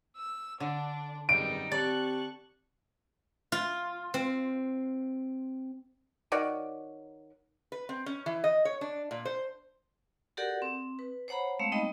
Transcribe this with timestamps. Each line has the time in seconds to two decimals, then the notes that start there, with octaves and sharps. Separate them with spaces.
0.16 E6
0.60 D3 D4
1.29 G#1 F#2 B2 G3 D#4 D7
1.72 C4 G4 D5 A5 C#6 F#6
3.52 F4
4.14 C4
6.32 D#3 F#4 C#5 D5
7.72 B4
7.89 C4
8.06 C#4
8.26 E3
8.44 D#5
8.65 C#5
8.81 D4
9.11 A#2
9.25 C5
10.37 F#4 G4 A4 A#4 D5 F#5
10.62 C4
10.99 B4
11.28 C5 C#5 F#5 A#5 B5
11.59 G#3 A3 C4 F5
11.72 G3 B3 D#4 D#5 G5 B5